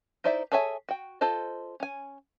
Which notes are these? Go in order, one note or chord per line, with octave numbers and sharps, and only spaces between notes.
D#4 E4 C5 D5 E5
G#4 A4 C#5 E5 G#5
F#4 G5
F4 A4 C5 D#5
C#4 G#5